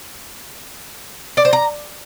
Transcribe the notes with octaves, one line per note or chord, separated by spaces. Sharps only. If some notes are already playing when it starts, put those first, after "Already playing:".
D5
C5
A#5